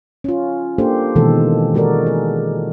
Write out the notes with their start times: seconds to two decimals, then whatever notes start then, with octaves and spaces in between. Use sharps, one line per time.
0.24 C#4 F4
0.78 A#3 D4 G4 A4 C5
1.16 B2 D#3 E3 G#3 A4
1.74 G#3 F#4 A4 A#4 D5
2.07 G#4